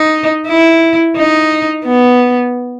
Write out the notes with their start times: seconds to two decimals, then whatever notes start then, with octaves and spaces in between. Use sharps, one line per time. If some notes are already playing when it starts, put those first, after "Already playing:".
Already playing: D#4
0.47 E4
1.17 D#4
1.86 B3